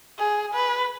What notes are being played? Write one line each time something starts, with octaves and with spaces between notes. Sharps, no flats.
G#4
B4